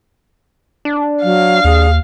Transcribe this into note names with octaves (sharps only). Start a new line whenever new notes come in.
D4
F#3 F5
D#2 G#4